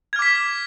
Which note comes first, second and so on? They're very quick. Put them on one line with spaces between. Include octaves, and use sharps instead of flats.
G#6 F6 D6 B6